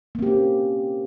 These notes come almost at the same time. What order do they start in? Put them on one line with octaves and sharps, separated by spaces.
A#3 C4 G4 C#4